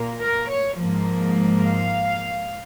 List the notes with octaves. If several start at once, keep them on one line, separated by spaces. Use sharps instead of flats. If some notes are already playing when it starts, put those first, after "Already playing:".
Already playing: A#2 A#3
A#4
C#5
G#2 F3 A#3
F5